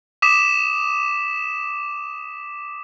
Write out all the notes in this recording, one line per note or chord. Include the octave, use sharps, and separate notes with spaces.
D6 D#6 B6 E7